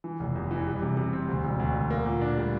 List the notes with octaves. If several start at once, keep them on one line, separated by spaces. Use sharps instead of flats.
E3
F1
E2
E3
G3
C3
C3
C4
D2
E1
D2
D2
A#3
A#2
D4
G3